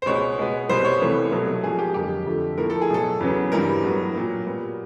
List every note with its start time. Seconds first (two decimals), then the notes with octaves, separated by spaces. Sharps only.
0.02 C5
0.06 C#2 B2 G#3 B3 C#5
0.39 B2 G#3 B3
0.69 C2 B2 G3 B3 C5
0.85 C#5
1.01 C2 C3 E3 A3
1.32 C2 B2 F#3 A3
1.63 G#2 F3 A#3 G#4
1.79 G4
1.94 F2 D3 F#3 A#3 G4
2.26 F2 D3 F3 A3
2.58 A2 F3 A#3 A#4
2.70 A4
2.82 G#4
2.89 B2 F#3 A3 A4
3.20 E2 C#3 F#3 B3
3.52 G2 E3 G3 A#3 A#4
3.83 A2 F#3 B3
4.14 A#2 F#3 A#3
4.46 A#2 G3 B3